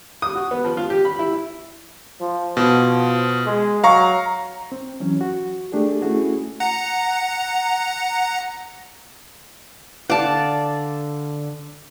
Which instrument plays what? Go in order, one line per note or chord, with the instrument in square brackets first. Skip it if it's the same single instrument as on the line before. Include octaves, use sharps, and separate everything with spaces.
[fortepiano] D#6
F#4
B3
F3
F4
G4
B5
E4
[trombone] F3
[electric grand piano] B2 [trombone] F3
[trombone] G#3
[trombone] F#3 [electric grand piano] F5 A#5 C#6
[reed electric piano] C4
E3 F#3 C#4
F#4
A3 D4 G4 G#4
A3 C#4 E4 F#4 G#4
[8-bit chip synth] F#5 A#5
[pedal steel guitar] D3 F5 F#5 [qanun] D5 A5